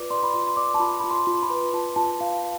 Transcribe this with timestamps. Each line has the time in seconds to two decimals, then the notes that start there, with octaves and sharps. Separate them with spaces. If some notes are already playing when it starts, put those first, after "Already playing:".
Already playing: F4 B4 D5 D6
0.11 D5 C6
0.23 B5
0.34 F4 C6
0.47 C6
0.57 D5 D6
0.74 A5
0.80 F4 B5
1.00 F4 B5
1.11 C6
1.27 F4
1.34 C6
1.42 B5
1.50 B4
1.73 F4 A5
1.96 F4 A5
2.20 F4 F5